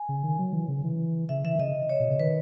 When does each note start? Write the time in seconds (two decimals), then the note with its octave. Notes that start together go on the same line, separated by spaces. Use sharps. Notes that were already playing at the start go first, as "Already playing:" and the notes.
Already playing: G#5
0.09 C#3
0.23 D#3
0.39 F#3
0.53 E3
0.68 C#3
0.84 E3
1.29 C#3 E5
1.44 E3 E5
1.55 D#3
1.59 C#3 D#5
1.89 C#5
2.00 B2
2.10 C#3
2.20 D#3 B4